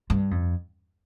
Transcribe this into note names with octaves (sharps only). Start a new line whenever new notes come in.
G2
F2